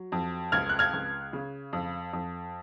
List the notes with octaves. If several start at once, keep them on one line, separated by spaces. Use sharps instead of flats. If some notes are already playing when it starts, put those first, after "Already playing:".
Already playing: F#3
F2
C#2 F6 G#6
F#6
F6 G#6
C#2
C#3
F2
F2